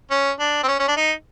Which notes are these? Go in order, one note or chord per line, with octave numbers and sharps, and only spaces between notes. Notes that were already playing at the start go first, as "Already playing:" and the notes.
C#4
D4
C4
C#4
C#4
D4
D#4